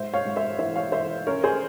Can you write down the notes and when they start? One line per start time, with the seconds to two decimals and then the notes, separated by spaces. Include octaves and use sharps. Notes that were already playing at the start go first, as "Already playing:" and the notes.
Already playing: G#2 C5 E5
0.13 C#5 F5
0.25 G#2
0.36 C5 E5
0.59 E3 C5 E5
0.76 C#5 F5
0.92 E3 C5 E5
1.27 C#4 A#4 C#5
1.43 G#4 C5